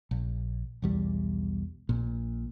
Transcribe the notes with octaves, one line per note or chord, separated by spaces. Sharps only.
A#1
B1 E2 G3
A#1 A#2